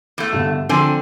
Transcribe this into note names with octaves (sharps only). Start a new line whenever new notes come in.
E2 A3
G2 B2 D3
D3 F3 C4 A4 G#5